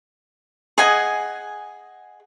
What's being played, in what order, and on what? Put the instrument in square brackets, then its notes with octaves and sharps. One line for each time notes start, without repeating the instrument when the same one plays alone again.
[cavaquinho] G#4 D#5 F#5 G#5